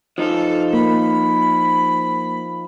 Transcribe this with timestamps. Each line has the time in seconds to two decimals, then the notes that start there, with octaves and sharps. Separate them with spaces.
0.18 F3 D#4 F4 A4
0.73 A#3 B5